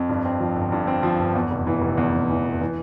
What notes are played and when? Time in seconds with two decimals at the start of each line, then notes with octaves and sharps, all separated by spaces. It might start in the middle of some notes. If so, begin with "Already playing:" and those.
Already playing: F2
0.09 G2
0.25 C4
0.40 F3
0.56 G1
0.72 G2
0.87 C4
1.03 F3
1.19 G1
1.35 E2
1.51 F1
1.67 E3
1.82 F1
1.97 E2
2.14 F1
2.30 E3
2.45 F1
2.61 E3